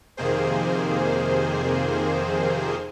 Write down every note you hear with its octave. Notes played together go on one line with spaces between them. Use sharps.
F2 C3 D#3 A#3 G#4 C5